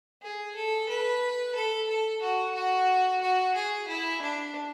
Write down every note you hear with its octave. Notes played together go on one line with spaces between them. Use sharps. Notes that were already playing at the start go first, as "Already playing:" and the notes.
G#4
A4
B4
A4
A4
F#4
F#4
F#4
G#4
E4
D4